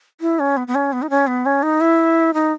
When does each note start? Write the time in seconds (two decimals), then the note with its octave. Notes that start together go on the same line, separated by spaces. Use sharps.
0.21 E4
0.39 C#4
0.57 B3
0.67 B3
0.75 C#4
0.92 B3
1.02 D#4
1.10 C#4
1.27 B3
1.46 C#4
1.63 D#4
1.80 E4
2.34 D#4